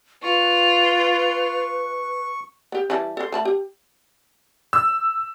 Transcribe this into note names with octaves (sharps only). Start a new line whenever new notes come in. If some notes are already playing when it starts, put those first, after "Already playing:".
F4 B4 C#6
B3 G4
E3 G3 A5
A4 C5
A3 A5 B5
G4
E6